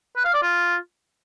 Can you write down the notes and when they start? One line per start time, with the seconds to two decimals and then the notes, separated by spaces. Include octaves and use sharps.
0.16 B4
0.25 F5
0.34 D5
0.42 F4